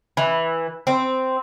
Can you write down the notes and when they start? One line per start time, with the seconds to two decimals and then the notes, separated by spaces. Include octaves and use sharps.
0.17 E3
0.87 C4